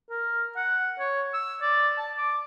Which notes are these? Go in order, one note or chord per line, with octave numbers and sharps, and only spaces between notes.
A#4
F#5
C#5
E6
D5
A5
D6